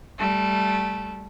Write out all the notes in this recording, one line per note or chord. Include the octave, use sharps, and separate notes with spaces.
G3 A3